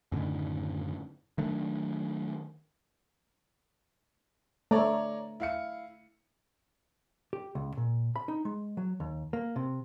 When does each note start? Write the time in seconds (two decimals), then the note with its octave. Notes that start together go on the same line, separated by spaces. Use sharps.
0.12 F#2 A2 D3 D#3
1.38 D#3 F#3 A3 D4
4.71 A3 C#5 D5 A#5
5.40 E4 F5 C#7
7.33 G4
7.55 C#2
7.77 A#2
8.16 B5
8.28 D#4
8.45 G#3
8.77 F#3
9.00 D#2
9.33 A#3
9.56 C3